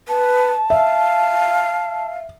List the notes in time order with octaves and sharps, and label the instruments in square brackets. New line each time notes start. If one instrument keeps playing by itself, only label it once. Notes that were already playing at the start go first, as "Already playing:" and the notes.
[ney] B4 [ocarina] A5
[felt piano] E5 [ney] F5